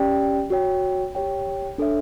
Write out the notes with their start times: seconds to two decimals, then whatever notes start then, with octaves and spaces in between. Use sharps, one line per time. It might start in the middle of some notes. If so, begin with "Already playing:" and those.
Already playing: C#4 G4 D5 G5
0.50 F#4 C#5 G5
1.15 G4 C#5 G5
1.78 D4 A4 C#5 E5